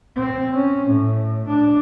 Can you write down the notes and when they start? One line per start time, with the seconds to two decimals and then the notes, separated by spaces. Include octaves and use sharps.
0.16 C4
0.55 C#4
0.88 A2
1.47 D4